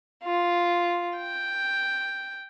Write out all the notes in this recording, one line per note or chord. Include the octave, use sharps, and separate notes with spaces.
F4
G5